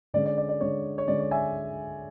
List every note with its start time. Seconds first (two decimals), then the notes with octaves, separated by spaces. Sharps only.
0.14 D3 G#3 C#4 D5
0.26 D5
0.38 D5
0.49 D5
0.61 D3 G#3 C#4 C#5
0.98 C#5
1.08 D3 G#3 C#4 D5
1.19 C#5
1.31 E5 G#5